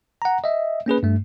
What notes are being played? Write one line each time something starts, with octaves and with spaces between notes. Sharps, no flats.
F#5 A#5
D#5 E5
A#3 C#4 G#4 B4
G2 A3